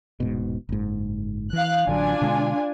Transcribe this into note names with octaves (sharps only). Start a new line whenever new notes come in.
D#1 G#2 B2
F#1 G#2
E3 F5 F#6
A1 D3 F#3 D4 F4 G#5
B2 D3 G#3